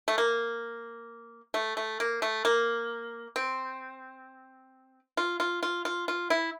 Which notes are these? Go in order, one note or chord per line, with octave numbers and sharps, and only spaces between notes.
A3
A#3
A3
A3
A#3
A3
A#3
C4
F4
F4
F4
F4
F4
E4